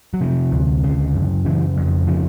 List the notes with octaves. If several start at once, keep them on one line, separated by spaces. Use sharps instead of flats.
F#3
C3 F3
D2
C#3
F#2
C#3 E3
F2
C#3 F3